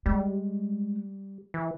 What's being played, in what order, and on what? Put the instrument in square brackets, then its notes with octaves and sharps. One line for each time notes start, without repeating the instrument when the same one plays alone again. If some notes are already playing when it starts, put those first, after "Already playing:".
[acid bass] G3 [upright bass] G#3
[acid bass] E3